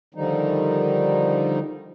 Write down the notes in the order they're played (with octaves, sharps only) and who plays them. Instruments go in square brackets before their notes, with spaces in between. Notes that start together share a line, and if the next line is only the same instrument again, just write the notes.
[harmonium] D3 D#3 F3 G3 D#4